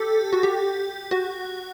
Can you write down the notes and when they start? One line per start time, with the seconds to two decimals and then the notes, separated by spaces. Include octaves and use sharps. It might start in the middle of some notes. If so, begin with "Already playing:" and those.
Already playing: G4 A4
0.33 F#4
0.43 G4
1.11 F#4